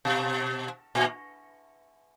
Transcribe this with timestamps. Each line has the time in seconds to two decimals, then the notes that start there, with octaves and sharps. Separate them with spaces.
0.05 B2
0.95 A#2